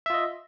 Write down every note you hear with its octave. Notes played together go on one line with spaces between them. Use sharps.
F4 D#5 E5